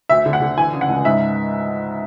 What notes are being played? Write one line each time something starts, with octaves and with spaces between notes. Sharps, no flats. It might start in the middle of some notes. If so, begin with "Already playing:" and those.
D2 E5
D3
F#5
D3
E3 G#5
C#3
F#5
C#2
G#2 E5